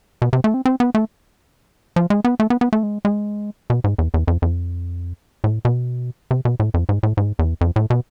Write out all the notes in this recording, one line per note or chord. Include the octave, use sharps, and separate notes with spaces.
B2
C3
A3
C4
C4
B3
A3
F3
G#3
B3
A3
B3
B3
A3
G#3
G#3
B2
G#2
E2
E2
F2
F2
A2
B2
C3
B2
A2
F2
G#2
A2
G#2
E2
F2
A2
B2